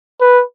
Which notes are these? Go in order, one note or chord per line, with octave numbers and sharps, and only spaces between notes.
B4